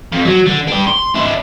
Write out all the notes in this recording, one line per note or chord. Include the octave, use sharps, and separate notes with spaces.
F2
F#3
D3
D4 G4
C6
D4 E4